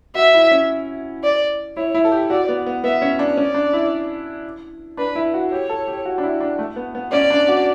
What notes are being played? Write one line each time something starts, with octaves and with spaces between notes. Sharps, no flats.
F#4 E5
E4
C#4
D5
E4 C#5
E4
A4
G4
F#4 D5
B3
B3
B3 E5
C#4
D4
C#4 D5
D4
E4
D4 B4
E4
F#4
G4 C#5
A4
G4
F#4
D4
E4
D4
A3
B3
B3
C#4 D5
D4
F#4